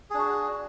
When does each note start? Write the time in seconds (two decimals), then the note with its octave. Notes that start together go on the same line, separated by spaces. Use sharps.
0.10 G#4
0.14 D4
0.18 F#4